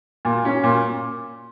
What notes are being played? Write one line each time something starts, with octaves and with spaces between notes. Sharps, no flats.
A#2
C#4
A#2